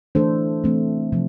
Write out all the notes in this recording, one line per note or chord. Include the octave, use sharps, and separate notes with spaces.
E3 A3 D4 A4 C5
E3 A3 C4
C3 F3